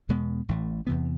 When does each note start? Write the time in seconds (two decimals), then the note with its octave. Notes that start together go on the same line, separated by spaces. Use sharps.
0.09 E2 B2 G#3 B3
0.49 A1 A2 E3 A3
0.87 E2 C3 E3 B3